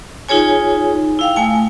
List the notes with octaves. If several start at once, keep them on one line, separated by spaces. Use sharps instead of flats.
D#4 F4 G#4 C#5 G#5
E4 F5 G5
A3 G#5